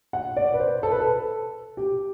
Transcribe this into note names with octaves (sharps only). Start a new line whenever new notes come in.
F#5
D5
B4
C5
A4
B4
A4
G4